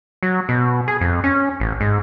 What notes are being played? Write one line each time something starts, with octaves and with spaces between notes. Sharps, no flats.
F#3
B2
G#4
F2
C#4
A1
G#2